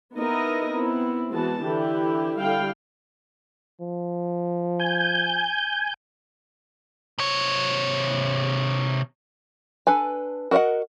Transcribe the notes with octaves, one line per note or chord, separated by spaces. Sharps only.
A#3 B3 D#4 E4 A#4 D#5
B3 C4 E4
E3 G#3 B3 F#4 A5
D3 E3 E4 G4
D3 G3 E4 F5 G5
F3
G#5 G6
C3 C#5
D4 A4 B4 G#5
F#4 A#4 D5 D#5 F#5